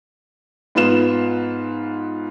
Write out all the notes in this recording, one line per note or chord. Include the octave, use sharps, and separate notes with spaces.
G#2 B3 F4 E7